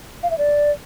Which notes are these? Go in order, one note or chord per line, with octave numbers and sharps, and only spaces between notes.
F5
E5
D5